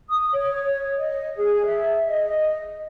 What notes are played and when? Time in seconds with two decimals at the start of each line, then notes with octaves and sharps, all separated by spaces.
0.09 D#6
0.33 C#5
0.97 D#5
1.36 G#4
1.65 E5
2.07 D#5